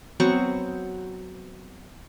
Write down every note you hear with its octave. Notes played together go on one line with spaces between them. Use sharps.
F#3 B3 C4 C#6